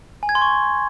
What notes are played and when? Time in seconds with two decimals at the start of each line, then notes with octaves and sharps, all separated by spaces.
0.23 G#5
0.29 G#6
0.35 C6
0.42 C#6